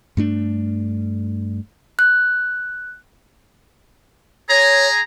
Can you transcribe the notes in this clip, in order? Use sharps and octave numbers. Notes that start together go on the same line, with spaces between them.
G2 A3 D4
F#6
G#4 C#5 A#5